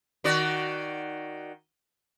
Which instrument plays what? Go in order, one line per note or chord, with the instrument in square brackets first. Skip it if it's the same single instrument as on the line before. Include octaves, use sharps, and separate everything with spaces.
[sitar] D#3 F#4 D5